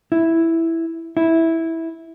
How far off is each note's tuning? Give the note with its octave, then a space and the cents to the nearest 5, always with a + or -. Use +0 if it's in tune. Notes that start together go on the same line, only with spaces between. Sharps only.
E4 +0
E4 -10